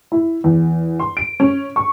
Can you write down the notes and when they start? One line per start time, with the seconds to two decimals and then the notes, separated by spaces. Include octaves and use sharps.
0.12 E4
0.44 E2
0.99 C6
1.17 D7
1.40 C#4
1.76 C#6